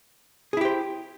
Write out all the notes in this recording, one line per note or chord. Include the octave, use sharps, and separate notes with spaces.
E4 G4 G#4 C5